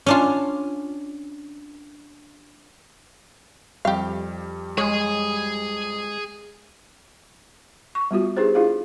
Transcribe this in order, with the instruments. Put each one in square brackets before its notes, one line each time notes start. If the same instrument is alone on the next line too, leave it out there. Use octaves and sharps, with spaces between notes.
[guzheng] C#4 D4 F4
[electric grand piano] F2 G3 [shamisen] G4 F5
[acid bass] G#3 [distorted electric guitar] G#4 G#5 [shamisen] C#5
[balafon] C#6
G3 B3 F4 F#4
D4 D#4 G4 G#4 B4 C5
D4 E4 F4 G#4 F5